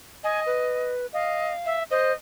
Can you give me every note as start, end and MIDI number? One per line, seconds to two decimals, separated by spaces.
0.24 0.92 75
0.24 0.40 80
0.46 1.06 71
1.13 1.53 75
1.13 1.78 77
1.66 1.83 76
1.90 2.12 72
1.90 2.13 75